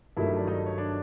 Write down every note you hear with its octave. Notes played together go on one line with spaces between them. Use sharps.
G2 D#3 F#3 A3 E4 E5
D5
D#4 D#5
C#5
D4 D5